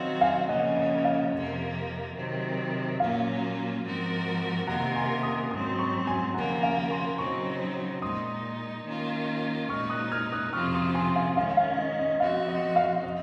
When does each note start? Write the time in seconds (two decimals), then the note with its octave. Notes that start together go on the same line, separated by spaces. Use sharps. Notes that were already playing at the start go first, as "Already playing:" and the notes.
Already playing: D#3 F#3 C4 F#4 D#5 F5
0.21 F5 G#5
0.49 C#3 F3 A#3 C#4 D#5 F#5
0.77 D#5
1.05 F5
1.33 F2 C3 F3 A#3
2.16 C3 D#3 F#3 C4
2.99 A#2 F#3 A#3 C#4 F4 F5
3.84 G#2 F3 C4 F#4 A#4
4.67 C3 D#3 A#3 F4 A#4 F#5 A#5
4.95 G#5 C6
5.23 C6 D#6
5.51 G#2 F#3 C4 C6 D#6
5.79 A#5 C#6
6.07 G#5 C6
6.34 D#2 C#3 F3 A#3 F#5 A#5
6.63 F5 G#5
6.91 G#5 C6
7.18 C#3 F#3 C4 D#4 A#5 C#6
8.02 A#2 G#3 D#4 C6 D#6
8.86 D#3 A#3 C#4 F4
9.69 A#2 G#3 D#4 C#6 F6
9.90 D#6 F#6
10.12 F6 G#6
10.32 D#6 F#6
10.53 F2 C3 F3 C4 F4 C#6 F6
10.74 C6 D#6
10.95 G#5 C6
11.16 F5 G#5
11.37 D#3 G#3 C#4 F5
11.57 F5
11.79 D#5
11.99 D#5
12.20 F3 C4 F#4 F5
12.48 D#5 F#5
12.76 F5
13.04 D#5